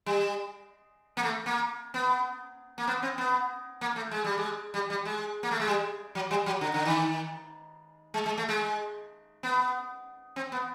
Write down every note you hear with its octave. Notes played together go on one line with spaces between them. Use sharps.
G3
A#3
A3
A#3
B3
A#3
B3
C4
B3
A#3
A3
G#3
G3
G#3
G3
G3
G#3
A#3
A3
G#3
G3
F#3
G3
F#3
D3
D3
D#3
G#3
G#3
A3
G#3
B3
C4
B3